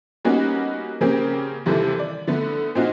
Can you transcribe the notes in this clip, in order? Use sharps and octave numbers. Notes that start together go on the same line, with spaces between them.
G3 A#3 B3 C#4 D#4 F#4
C#3 A#3 C4 C#4 G4 A#4
D#2 C3 E3 G3 A4
D5
D3 A3 B3
A#2 C4 D#4 F4 F#4